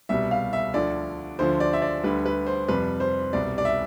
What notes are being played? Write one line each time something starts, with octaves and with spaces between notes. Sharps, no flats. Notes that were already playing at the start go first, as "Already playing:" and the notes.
C2 B2 G3 E5
F5
E5
D2 D3 F3 D5
D2 D3 F3 C5
D5
E5
D5
D2 D3 G3 B4
B4
C5
F2 C3 G3 B4
C5
C2 B2 G3 D5
D5
E5